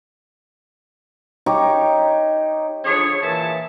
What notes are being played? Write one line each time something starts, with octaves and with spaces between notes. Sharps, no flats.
D#4 G4 C#5
D3 F3 G#4 C#5
A#2 E3 E5 A5